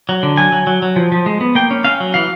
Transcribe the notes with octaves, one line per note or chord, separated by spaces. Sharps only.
F#3
D3
F#3 G#5
F#3
F#3
F#3
F3
F3
G#3
B3
A#3 G5
C#4
C#4 F5
F#3
E3 F5